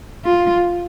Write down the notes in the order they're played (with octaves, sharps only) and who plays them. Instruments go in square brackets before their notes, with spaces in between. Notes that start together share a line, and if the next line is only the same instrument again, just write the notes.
[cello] F4